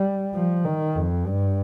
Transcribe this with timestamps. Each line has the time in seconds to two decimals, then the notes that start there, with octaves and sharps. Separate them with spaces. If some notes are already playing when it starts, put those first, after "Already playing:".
Already playing: G3
0.35 F3
0.64 D#3
0.95 F2
1.26 G2